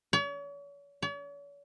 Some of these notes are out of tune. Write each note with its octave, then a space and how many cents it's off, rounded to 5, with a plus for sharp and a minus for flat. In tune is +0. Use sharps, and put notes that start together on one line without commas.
C#5 +40
C#5 +45